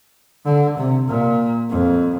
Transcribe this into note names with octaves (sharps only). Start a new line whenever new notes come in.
D3
C3
A#2
F2